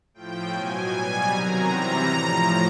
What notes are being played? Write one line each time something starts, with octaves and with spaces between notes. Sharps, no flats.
A2 F3 G5
B2 F#3 G#5
B2 G3
C3 D#3 F#3 A#5
C3 E3 G3
A2 F3